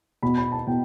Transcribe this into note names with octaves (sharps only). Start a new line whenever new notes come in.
B2 B5
B5
A5
B2 G5